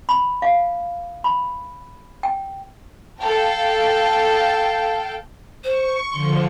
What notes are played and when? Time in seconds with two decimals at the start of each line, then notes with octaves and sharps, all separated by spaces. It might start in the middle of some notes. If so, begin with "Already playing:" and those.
0.09 B5
0.42 F5
1.24 B5
2.23 G5
3.20 A4 F5 G5 A5
5.64 C5 C#6
6.12 D3 F3 C6